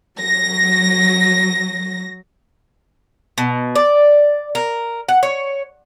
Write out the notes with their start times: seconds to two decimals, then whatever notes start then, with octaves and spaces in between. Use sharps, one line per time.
0.17 F#3 A#6
3.38 B2
3.76 D5
4.55 A#4
5.09 F#5
5.23 C#5